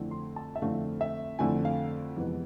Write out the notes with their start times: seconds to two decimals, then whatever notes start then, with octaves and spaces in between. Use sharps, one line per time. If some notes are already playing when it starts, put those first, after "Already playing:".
Already playing: F2 D3 A3 C4 E4
0.11 C6
0.36 A5
0.56 E5
0.62 F2 D3 A3 C4 E4 F5
1.01 E5
1.39 F2 D3 A3 C4 E4 G#5
1.65 F5
2.16 F2 C3 E3 G#3 B3